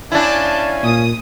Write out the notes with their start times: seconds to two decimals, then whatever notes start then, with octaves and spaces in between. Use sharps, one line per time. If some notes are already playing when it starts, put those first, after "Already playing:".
0.12 C#4 D4 E4 D5 F5 G#5 A5 G6
0.83 A#2 D#6